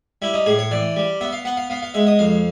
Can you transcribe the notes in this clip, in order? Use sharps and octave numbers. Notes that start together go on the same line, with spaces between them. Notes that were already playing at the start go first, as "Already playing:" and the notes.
G3 E4
D#4
A2 G#4
C#5
E3 D5
G3
B3 E5
F5
B3 F#5
F5
B3 F5
F5
G#3 E5
D#5
F2 F5